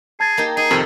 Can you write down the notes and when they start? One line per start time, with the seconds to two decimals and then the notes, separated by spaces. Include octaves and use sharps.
0.20 G#4 A5 G#6 A6
0.37 A#3 D#4 G4
0.57 D#4 G#4
0.71 F2 C3 D#3 A4